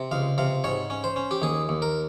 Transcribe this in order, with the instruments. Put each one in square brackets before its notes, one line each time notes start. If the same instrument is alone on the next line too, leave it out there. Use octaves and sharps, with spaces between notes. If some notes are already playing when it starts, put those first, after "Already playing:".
Already playing: [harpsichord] C3
C#2 F5
C3 F5
G#2 C#5
C#4
C5
C#4
G4
D#2 G#4
D#2
A#4